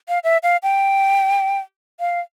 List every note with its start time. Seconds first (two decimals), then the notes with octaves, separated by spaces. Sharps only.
0.09 F5
0.24 E5
0.43 F5
0.63 G5
2.00 F5